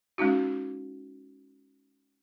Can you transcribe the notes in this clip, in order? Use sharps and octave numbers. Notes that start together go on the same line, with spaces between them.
G#3 C#4 D#4 F#4